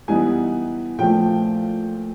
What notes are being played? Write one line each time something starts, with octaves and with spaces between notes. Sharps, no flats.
E3 G3 B3 D#4 G#5
A#2 F3 A3 G5